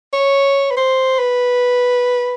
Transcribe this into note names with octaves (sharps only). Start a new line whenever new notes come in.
C#5
B4
C5
B4